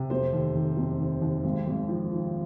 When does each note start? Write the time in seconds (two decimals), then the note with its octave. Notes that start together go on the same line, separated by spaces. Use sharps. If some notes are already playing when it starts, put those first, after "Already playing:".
Already playing: C3
0.10 F1 C5
0.33 D#2
0.55 D#2
0.77 F1
1.00 D#2
1.22 D#2
1.44 G#1
1.66 G#1
1.89 F3
2.11 F3